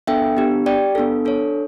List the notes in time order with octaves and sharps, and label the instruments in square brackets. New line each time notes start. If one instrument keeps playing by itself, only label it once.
[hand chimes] B3 D4 A4 E5 G5
B3 D4 G4
G4 D5 G5
B3 D4 A4
D4 A4 C#5